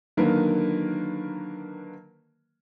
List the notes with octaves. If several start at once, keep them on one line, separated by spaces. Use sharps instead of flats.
D3 D#3 F#3 A#3 A#4 B4